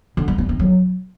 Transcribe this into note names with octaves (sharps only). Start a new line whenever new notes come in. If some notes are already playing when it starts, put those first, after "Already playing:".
D3
G3
C#4
C4
F#3